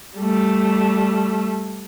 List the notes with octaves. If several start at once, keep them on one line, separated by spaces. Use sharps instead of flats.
G3 A3